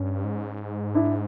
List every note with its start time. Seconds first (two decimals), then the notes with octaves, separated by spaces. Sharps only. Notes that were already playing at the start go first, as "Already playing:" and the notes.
Already playing: G2 C#4
0.24 G#2
0.95 D4 E4